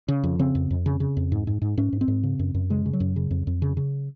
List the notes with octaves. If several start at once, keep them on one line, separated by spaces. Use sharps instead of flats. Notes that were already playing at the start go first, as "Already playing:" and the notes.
C#3
F2
C#3 C4
F2
F2
C#3
C#3
F2
G#2
G#2
G#2
G#2 C#4
G#2
C4
G#2
C#3
F#2
F#2
C#3 G#3
C#3
F#3
F#2
C#3
F2
F2
C#3
C#3